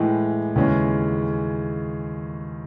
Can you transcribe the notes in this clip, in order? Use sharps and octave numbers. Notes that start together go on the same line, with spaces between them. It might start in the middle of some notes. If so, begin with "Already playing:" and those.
Already playing: A2 E3 G#3
D#2 C#3 E3 G#3 C#4